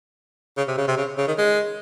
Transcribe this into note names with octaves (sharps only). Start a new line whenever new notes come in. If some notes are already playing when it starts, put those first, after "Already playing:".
C#3
C3
C#3
C3
C#3
C#3
D#3
G#3